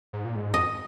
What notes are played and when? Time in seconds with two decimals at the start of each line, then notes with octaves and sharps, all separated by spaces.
0.13 G#2
0.25 A#2
0.35 G#2
0.53 F2 D#5